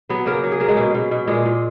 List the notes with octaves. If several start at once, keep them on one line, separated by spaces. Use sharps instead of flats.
F#3 B3 B4
C#3 A#3 A#4
F#3
G#4
C#3 A#4
G#3 G#4
B2
B2
B2
A#2 G#3 G#4
A#2